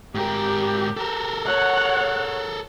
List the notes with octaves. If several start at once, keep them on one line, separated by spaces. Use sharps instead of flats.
G#2 G4 A#4
A4 A#4
C#5 F#5